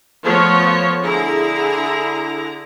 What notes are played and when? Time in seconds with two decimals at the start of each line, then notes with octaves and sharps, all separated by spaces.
0.25 F3 A3 B3 C#5
1.01 D3 E4 G#4 A#5